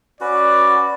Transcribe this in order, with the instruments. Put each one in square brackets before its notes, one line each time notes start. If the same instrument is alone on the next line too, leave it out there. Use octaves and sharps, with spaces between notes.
[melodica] C#4 F#4 B4 [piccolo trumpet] D5